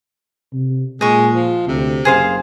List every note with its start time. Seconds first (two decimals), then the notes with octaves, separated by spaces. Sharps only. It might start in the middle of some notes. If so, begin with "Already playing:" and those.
0.53 C3
1.01 A#2 G#3 D#5 C#6
1.33 F3
1.67 D2 C3
2.05 F#1 G#4 C5 F5